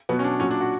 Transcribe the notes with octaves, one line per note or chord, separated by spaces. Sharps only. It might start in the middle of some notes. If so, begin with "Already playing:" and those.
B2 F#3 B3
C#4
D4
A#2 F#3 C#4
D4
F#4